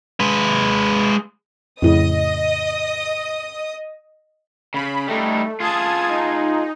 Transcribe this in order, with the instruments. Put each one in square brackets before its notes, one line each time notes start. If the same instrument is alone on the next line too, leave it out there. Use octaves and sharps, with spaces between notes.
[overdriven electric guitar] G#3 B4
[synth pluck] F2 A2 C#3 [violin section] D#5 D#6
[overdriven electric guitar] C#3 [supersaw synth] B5
[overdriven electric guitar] G3 D#4 [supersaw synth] A3
[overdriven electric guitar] F4 G#4 [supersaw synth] A5 D#6 G#6
[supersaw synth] D#4